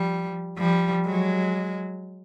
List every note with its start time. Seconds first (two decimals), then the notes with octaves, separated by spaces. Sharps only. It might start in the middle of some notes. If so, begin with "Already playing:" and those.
Already playing: F3 G3
0.57 F3 G3
1.06 F#3 G#3